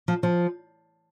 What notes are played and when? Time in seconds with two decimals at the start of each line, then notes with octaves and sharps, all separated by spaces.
0.08 F3
0.23 F3